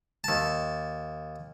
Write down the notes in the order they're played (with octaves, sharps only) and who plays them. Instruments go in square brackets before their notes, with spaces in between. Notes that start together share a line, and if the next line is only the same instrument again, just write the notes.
[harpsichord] D#2 A5